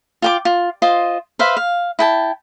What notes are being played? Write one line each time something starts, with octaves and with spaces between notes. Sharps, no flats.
F4 G5 D6
F4
F4 C5 D#5
B4 C5 E5 F5
F5
E4 G5 A5